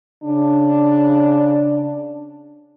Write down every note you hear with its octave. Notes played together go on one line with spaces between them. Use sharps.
C#3 D4